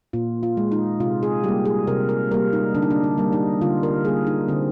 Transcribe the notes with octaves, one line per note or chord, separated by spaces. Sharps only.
A#2 F4
F4
G#3
D#4
C3 F4
G#4
G3 A#3 G4
G#4
C3 A#4
A#4
G3 A#3 A#4
D#4
D3 D4
D#4
D4
D#4
G3 A#3
D#4
D3 F4
A#4
G3 A#3 G#4
D#4
D3 C4